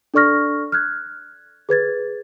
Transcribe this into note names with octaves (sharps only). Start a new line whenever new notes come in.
D4 A4 D5 C#6 F6 A#6
F6 F#6 G#6
G#4 B4 G#6 A6